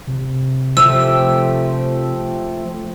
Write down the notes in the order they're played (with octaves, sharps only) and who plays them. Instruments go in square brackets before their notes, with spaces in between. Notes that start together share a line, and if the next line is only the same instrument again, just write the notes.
[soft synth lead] C3
[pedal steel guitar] F3 A3 G4 [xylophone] E6